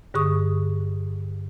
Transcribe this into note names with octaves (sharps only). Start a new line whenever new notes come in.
G2 D3 G#4 C#6 D#6